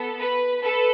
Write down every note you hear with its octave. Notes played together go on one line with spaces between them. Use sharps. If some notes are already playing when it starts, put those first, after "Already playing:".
Already playing: B3 A4
B4
A4 B4